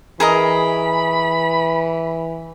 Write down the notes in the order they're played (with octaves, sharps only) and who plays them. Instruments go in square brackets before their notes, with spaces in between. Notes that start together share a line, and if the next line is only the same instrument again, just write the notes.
[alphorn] E3 [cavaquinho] G#4 A#4 D#5 [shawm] B5